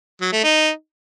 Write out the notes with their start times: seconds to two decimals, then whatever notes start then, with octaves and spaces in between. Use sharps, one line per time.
0.21 F#3
0.32 A3
0.43 D#4